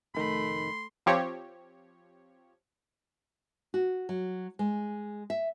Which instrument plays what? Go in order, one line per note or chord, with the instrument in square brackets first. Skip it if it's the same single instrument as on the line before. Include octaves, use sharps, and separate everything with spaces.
[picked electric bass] F1 D#3 [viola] A3 B5 [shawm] C6
[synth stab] F3 C4 G4 C#5
[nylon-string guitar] F#4
F#3
G#3
E5